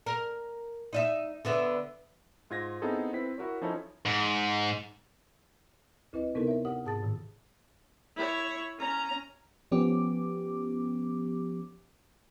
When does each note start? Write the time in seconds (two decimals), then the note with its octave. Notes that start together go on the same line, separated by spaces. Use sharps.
0.06 A#4
0.93 D#4 D#5 E5
1.45 D3 B3 E5
2.50 G#2 F4 G#6 A#6
2.82 B3 C4 D#4 E4 G#4 A4
3.13 C4 E4 B4 B6
3.38 E4 F#4 A#4 C#5
3.62 F3 C#4 D#4 E4 A4 C#5
4.05 G#2
6.13 D2 E4 B4 D#5
6.35 C3 B3 D#4 E4 A4 A#4
6.47 C#5 E5
6.65 G4 C#5 F#5 D#6
6.85 G#2 G#4 A5 D#6 A6
7.03 A2 D#3
8.16 E4 C#5
8.79 C#4 A#5
9.72 F3 B3 C#4 G4 D6